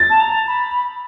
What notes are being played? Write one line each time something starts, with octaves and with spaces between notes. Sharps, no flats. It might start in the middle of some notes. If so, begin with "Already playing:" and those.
Already playing: A6
A5
A#5
B5